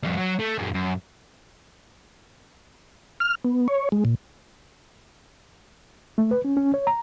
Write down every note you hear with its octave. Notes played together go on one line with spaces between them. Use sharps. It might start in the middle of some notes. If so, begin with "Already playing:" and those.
F2 G3
F#3
A3
F#2 G#3
F#2
F6
B3
C#5
G#3
A#2
A3
B4
C#4
C#4
C#5
A#5